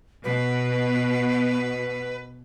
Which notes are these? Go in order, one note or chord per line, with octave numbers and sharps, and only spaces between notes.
B2 B4